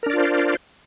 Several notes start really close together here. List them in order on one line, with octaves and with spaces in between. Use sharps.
A#4 D4 D5 F4 C5